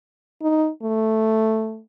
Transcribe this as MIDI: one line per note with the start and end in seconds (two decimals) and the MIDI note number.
0.42 0.69 63
0.82 1.81 57